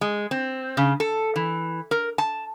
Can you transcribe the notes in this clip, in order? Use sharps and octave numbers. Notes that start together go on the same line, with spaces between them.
G#3
C4
C#3
A4
E3
A#4
A5